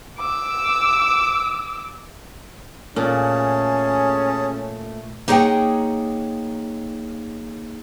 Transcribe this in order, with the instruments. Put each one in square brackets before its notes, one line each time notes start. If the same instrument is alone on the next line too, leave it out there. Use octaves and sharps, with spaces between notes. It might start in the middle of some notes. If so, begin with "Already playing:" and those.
[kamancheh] D6 E6
[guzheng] A#2 [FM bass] A3 [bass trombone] C#4 [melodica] G#4 A5
[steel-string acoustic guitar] A#3 D#4 G#4 C#5 F#5 G5